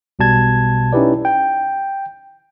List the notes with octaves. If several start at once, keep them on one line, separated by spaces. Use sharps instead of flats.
B1 B2 G3 A5 G#6
C#4 D#4 E4 G4 B4 D5
G5